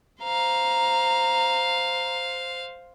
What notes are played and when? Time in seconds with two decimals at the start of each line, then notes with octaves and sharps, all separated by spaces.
0.24 C5 F5 A#5